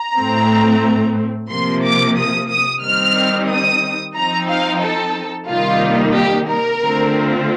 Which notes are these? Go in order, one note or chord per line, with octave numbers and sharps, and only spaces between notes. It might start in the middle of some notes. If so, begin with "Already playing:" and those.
Already playing: A#5
A2 A3 C4
C3 F3 A#3 C6
D6
D#6
D#6
D#3 G3 C4 D#4 F6
D#6
F3 C4 D#4 A#5
F5
A4
C3 D#3 G3 A#3 D#4 F4
G4
A#4
D3 A3 C4 F4